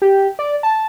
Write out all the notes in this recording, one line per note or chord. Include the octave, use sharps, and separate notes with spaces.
G4
D5
A5